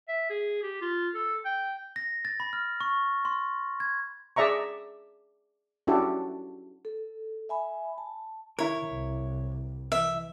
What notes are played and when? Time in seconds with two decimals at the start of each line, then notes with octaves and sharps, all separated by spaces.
0.08 E5
0.30 G#4
0.63 G4
0.81 F4
1.15 A4
1.45 G5
1.96 A#6
2.25 A6
2.40 B5
2.53 F6
2.81 C#6
3.25 C6
3.80 G#6
4.36 G#4 D5 E5 A#5 C#6
5.87 C#4 D4 E4 F#4 G4 A4
6.85 A4
7.49 E5 G#5 B5
7.98 A5
8.59 D#3 E4 A#4 C#5
8.88 C2
9.92 E3 E5